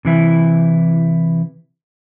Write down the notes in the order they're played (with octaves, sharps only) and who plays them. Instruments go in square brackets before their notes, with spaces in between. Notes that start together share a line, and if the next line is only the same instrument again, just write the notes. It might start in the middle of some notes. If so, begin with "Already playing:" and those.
[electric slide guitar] C3 E3 E4